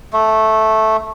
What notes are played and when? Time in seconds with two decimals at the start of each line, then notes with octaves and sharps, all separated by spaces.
0.13 A3